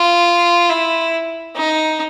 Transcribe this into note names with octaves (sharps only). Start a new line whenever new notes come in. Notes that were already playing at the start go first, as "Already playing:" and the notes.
Already playing: F4
E4
D#4